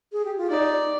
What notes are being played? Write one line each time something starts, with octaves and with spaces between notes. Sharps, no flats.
G#4
G4
F4
D#4 D5